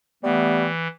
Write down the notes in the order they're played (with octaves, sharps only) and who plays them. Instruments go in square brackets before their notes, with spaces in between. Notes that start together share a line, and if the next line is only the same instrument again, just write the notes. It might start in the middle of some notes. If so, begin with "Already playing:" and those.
[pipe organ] E3 [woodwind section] G3 A3 B3